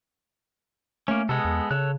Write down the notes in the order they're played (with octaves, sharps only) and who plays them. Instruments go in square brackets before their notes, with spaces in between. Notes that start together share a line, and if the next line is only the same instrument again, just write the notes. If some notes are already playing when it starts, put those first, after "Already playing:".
[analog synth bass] A3 [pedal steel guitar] A#3 C#4
[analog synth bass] C3 [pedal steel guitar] G#3 B3 A4
[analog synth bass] E2
[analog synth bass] C#3 [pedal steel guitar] A4 C#5 F#6